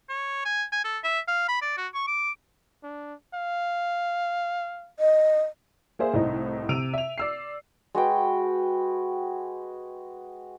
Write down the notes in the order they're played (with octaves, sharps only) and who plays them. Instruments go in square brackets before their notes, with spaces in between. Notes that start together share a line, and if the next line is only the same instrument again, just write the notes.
[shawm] C#5
G#5
G#5
A4
E5
F5
B5
D5
F#4
C#6
D6
[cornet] D4
F5
[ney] D#5
[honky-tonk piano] A#3 G#4 C5 E5
C2 A2 C4 D#4
C3 E6 D7 D#7 F7
E5 F7
D5 E6 C7
[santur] G#3 F#4 B4 G5